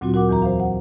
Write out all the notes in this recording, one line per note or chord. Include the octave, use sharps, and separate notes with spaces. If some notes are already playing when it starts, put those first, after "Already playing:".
D2 A#2 F#3 C4 F4 F#4
F#4 A#4 F#5 D6
E2 E3 A#5
C5 F5
F#5